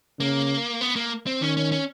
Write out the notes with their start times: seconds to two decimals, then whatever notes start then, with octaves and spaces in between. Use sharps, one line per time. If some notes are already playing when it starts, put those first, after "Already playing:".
0.20 C#3 A#3
0.81 B3
0.96 A#3
1.27 C4
1.41 D#3 C#4
1.57 C#4
1.72 C#4